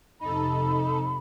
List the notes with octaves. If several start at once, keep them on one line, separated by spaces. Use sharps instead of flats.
F2 C3 D#4 A4 B5